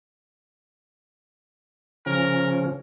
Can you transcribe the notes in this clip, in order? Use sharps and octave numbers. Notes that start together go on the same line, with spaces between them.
C#3 F3 C#4 A#4